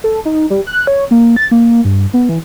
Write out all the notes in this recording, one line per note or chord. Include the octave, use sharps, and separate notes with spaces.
A4
D#4
G3
F#6
C#5
A#3
A6
A#3
G2
B3
E3